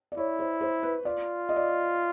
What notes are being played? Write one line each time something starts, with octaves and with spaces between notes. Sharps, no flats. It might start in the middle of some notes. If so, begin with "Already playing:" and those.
D5
E4 C#5
C5
C5
B4
F4 D5
D#5
D5